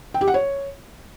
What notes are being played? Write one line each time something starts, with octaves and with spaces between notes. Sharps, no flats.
G5
G4
F#5
C#5